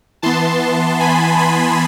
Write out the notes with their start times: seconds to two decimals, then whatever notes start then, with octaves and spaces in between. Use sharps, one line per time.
0.22 E3 B3 A5 C6
1.00 G#5 B5
1.38 G#5 B5